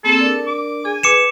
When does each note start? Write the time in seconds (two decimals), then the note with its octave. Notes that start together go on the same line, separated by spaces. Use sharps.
0.04 A#3 C4 G#4 A4
0.20 D4 A#4 D5
0.46 D6
0.85 G#4 G#5
1.03 B4 D6 C#7 E7